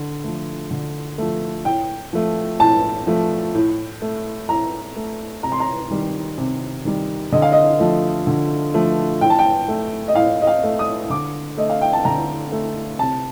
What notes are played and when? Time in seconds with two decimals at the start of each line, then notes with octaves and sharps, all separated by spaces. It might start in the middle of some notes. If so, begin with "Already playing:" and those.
Already playing: D3
0.24 F3 A3
0.71 D3
1.18 F3 A3
1.65 A2 G5
2.13 F3 A3
2.60 A2 A5
3.07 F3 A3
3.55 A2
4.02 A3
4.49 A2 A#5
4.96 A3
5.43 C3 A#5
5.52 C6
5.60 A#5
5.91 D#3 G3
6.38 C3
6.85 D#3 G3
7.32 D3 D#5
7.42 F5
7.52 D#5
7.79 F3 A3
8.27 D3
8.74 F3 A3
9.21 A2 G5
9.30 A5
9.39 G5
9.68 A3
10.08 D#5
10.15 A2 F5
10.42 D#5
10.47 F5
10.64 A3
10.79 D#6
11.10 D3 D6
11.58 A3 D#5
11.70 F5
11.81 G5
11.93 A5
12.05 D3 A#5
12.52 A3
12.99 C3 A5